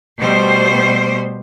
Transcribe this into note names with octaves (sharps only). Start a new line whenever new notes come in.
B2 G3 A3 C5